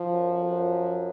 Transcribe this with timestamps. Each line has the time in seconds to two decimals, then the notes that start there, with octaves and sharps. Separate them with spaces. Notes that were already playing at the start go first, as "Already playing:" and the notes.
Already playing: F3
0.12 F#2
0.30 F#2
0.40 F2
0.50 F#2